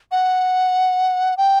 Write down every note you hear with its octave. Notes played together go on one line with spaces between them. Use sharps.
F#5
G5